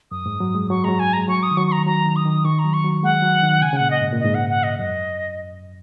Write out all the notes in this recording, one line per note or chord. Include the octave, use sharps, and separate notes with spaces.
F#2 D#6
G#2
F#3
G#3
F#3 C#6
F#3 G#3 A#5
G#5
G#3 A#5
F#3 C#6
D#6
D#3
F#3 C#6
C#6
A#5
D#3
F#3 A#5
D#3
D#6
D#3
D#3 C#6
A#5
F#3
C#6
F#3
G#3 F#5
F#3
D#3
C#3 G#5
C#3
A#2 F#5
D#5
G#2
A#2
G#2 D#5
F#5
F#5
D#5
F#2 D#5